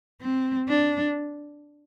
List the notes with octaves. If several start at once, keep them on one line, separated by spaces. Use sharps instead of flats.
C4
D4